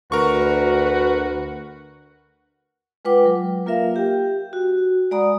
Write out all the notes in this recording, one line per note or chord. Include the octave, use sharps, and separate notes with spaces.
D2 F#4 A#4 B4 C#6
G#3 F4 B4 F#5 G5 D6
F#3
A#3 F4 A#4 E5 F5
G4 G5
F#4
G#3 D5 F#5 A#5 B5 D#6